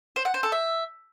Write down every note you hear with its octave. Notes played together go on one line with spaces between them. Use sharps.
C5
F#5
C5
A4
E5